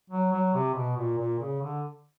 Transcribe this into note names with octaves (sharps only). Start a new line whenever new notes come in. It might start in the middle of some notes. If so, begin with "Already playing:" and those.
F#3
F#3
C3
B2
A#2
A#2
C#3
D3